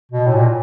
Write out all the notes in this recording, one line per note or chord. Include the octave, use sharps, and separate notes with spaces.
B2
A2
A#2